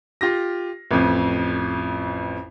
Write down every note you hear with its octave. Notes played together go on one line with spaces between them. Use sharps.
F4 G4 A#6
A1 F2